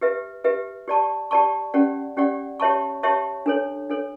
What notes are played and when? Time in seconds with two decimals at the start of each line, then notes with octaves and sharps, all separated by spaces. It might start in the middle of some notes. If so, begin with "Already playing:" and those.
0.01 G4 B4 E5
0.44 G4 B4 E5
0.88 G4 D5 A5 C#6
1.31 G4 D5 A5 C#6
1.74 C#4 G4 D5 F#5
2.17 C#4 G4 D5 F#5
2.60 G4 C#5 E5 A5 C#6
3.03 G4 C#5 E5 A5 C#6
3.46 D4 A4 C#5
3.90 D4 A4 C#5